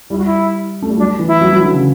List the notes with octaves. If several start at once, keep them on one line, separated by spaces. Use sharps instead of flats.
G3 E4
F#4
E4
A3
G3
F#3 D4
E3
E4
F#3
F#3
D3
C#3